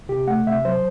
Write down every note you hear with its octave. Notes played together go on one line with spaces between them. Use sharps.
C3 G4
A3 F#5
C3 E5
F#3 C5